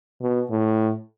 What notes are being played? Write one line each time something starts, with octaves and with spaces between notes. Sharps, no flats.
B2
A2